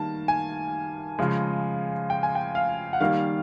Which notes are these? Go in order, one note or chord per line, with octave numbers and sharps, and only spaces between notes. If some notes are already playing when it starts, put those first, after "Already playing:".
Already playing: D#3 G3 A#3 A5
G#5
C#3 F3 G#3
G5
G#5
G5
F5
F#5
D#3 G3 A#3 F5